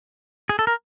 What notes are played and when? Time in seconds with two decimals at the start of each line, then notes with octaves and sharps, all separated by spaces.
0.49 G#4
0.59 A4
0.67 A#4